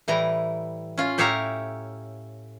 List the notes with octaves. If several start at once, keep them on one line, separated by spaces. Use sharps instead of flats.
A2 E3 G3 A#5
C#4 F4
A2 G4 C#5 E5 F5 A#5